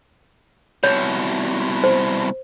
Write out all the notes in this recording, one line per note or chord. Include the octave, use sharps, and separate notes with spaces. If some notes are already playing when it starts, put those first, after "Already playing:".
C2 B2 C#5
C5